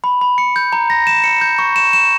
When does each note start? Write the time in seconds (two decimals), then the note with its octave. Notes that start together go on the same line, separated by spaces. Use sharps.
0.04 B5
0.21 B5
0.38 C#7
0.56 G6
0.73 A#5
0.90 A#6
1.07 E7
1.24 C#7
1.41 G6
1.59 C#6
1.76 E7
1.93 E7